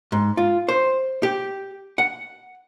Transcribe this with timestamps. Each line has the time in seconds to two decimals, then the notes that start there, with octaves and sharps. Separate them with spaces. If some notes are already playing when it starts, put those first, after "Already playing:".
0.12 G#2
0.37 F4
0.68 C5
1.23 G4
1.98 F#5